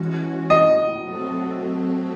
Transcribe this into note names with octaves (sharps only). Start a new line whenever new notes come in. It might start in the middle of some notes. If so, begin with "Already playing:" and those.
Already playing: E3 G#3 C#4 F#4
D#5
F#3 A3 C4 F#4 A4